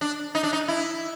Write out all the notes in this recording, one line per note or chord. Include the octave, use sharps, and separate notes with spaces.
D4
D#4
D4
D#4
E4